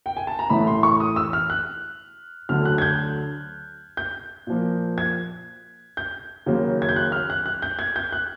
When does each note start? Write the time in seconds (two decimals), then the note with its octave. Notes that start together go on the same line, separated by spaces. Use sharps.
0.06 G5
0.17 G#5
0.27 A5
0.39 A#5
0.50 A1 A2 E3 A3 B5
0.67 C6
0.83 C#6
1.00 D#6
1.16 E6
1.33 F6
1.50 F#6
2.49 D2 D3 F#3 F6
2.65 F#6
2.78 G#6
2.82 G6
3.97 G6
4.47 A#2 F3 A#3
4.98 G#6
5.97 G6
6.46 D#2 C#3 F#3 A#3
6.82 G#6
6.89 G6
6.96 F#6
7.12 F6
7.30 F#6
7.46 F#6
7.62 G6
7.79 G#6
7.96 G6
8.12 F#6